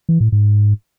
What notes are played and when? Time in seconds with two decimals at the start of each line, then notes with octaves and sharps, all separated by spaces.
0.09 E3
0.20 A2
0.32 G#2